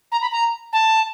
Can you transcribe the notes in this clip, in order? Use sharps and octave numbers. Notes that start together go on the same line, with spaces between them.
A#5
B5
A#5
A5